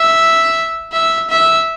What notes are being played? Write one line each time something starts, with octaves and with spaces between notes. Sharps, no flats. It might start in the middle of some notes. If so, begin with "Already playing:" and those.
Already playing: E5
E5
E5